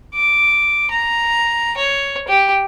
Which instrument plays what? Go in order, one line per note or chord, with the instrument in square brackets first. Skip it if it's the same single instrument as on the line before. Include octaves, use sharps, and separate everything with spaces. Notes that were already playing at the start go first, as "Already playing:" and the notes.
[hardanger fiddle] D6
A#5
C#5
G4